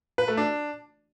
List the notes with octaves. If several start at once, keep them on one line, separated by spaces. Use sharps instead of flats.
B4
A3
D4